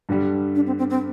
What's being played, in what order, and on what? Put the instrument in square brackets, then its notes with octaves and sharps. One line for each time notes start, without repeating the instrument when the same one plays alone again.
[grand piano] G2 D3 G3
[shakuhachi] D4
C4
C4
C4